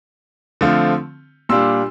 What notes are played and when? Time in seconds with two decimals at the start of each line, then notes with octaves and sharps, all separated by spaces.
0.61 D3 F3 A3 C4 F4
1.49 A#2 G3 D4 F4 C6 E6